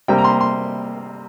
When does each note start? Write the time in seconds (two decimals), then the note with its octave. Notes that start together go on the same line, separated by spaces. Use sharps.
0.08 C3 G3 A#3 G5
0.18 A#5
0.24 C6
0.41 C6